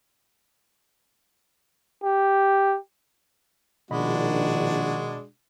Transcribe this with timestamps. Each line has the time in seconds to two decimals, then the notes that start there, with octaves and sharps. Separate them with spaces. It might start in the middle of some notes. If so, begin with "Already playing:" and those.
2.04 G4
3.91 A#1 B2 D#3 G#3 D4 F#4 D#5 B5